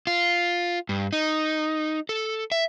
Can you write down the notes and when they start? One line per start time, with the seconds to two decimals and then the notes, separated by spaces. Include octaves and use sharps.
0.07 F4
0.89 G2
1.13 D#4
2.09 A4
2.52 E5